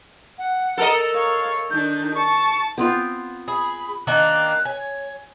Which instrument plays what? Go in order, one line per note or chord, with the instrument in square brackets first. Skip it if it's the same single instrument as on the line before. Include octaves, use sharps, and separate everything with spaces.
[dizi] F#5
[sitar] A4 A#4 D#5
[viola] C#5 [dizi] F5
[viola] D#3 D4 [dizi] G6
[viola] A5 [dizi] C#6
[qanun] B3 C4 F4
[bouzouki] G#4 [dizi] B5
[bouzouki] D#3 A#3 D4 [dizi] F#6
[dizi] C#5 [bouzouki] G#5